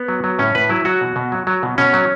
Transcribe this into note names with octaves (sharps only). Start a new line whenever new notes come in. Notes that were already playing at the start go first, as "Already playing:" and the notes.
Already playing: B3
F#3
F#3
A2 C#4
A2 B4
F#3 E4
F#3 F#4
B2
B2
F#3
F#3
B2
B2 C#4
F#3